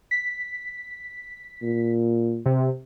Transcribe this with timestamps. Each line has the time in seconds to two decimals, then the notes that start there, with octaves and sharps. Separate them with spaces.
0.11 B6
1.62 A#2
2.46 C3